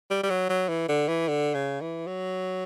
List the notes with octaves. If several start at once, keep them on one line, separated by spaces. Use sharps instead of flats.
G3
G3
F#3
F#3
E3
D3
E3
D3
C#3
E3
F#3